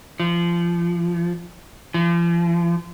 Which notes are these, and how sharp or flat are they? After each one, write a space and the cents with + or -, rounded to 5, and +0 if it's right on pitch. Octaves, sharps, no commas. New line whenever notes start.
F3 -25
F3 -40